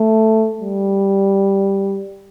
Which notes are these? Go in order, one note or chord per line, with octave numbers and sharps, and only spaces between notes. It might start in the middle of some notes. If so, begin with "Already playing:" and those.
Already playing: A3
G3